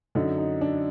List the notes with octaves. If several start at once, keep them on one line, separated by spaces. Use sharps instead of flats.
F#2 D3 D#4
D#4
D4